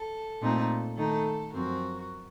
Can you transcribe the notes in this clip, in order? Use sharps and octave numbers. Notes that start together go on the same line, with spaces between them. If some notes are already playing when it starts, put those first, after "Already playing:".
Already playing: A4
A#2 A3 C4 D#4
D#3 A3 D#4 A4
F#2 F3 C4 F#4 A#4